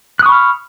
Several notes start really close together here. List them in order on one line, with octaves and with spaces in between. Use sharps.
F#6 D#6 C#6 B5 F6